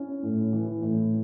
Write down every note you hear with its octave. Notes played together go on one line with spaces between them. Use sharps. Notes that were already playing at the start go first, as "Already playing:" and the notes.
Already playing: C#4 E4
A2
E3
A2